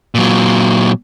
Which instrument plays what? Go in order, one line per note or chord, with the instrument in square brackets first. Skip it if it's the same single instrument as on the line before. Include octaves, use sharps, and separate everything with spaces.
[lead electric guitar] A#2 F#3